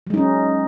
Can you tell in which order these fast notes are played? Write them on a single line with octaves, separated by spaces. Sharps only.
F#3 G#3 D#4 C#4